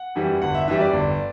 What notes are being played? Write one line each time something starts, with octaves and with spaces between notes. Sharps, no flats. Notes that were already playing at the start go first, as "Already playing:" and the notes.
Already playing: F#5
F#2 E3 G3
G1 F#5
E5
F#2 E3 G3 E5
D5
G1